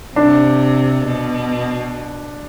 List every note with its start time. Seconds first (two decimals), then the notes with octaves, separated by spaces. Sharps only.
0.16 C3 D4
1.05 B2